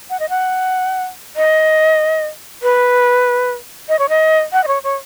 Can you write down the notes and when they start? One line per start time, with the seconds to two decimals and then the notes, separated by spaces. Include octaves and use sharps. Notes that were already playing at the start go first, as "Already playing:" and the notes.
0.10 F#5
0.20 D#5
0.29 F#5
1.36 D#5
2.62 B4
3.89 D#5
3.99 C#5
4.09 D#5
4.53 F#5
4.64 D#5
4.67 C#5
4.84 C#5